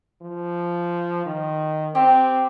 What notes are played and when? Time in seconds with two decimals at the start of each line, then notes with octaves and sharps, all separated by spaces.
0.22 F3
1.26 D#3
1.95 C4 G4